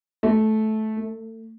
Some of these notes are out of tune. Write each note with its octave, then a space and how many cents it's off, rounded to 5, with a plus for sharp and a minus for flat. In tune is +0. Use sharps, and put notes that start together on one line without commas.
A3 -15
A3 +30